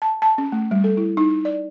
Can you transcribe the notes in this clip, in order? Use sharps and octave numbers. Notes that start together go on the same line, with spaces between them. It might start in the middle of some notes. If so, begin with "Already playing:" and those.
A5
A5
C#4
A3
G3
A4
E4
D#4
D5